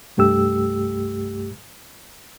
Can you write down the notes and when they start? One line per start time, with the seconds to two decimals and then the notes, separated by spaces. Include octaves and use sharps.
0.17 C2 G2 A3 G4 E6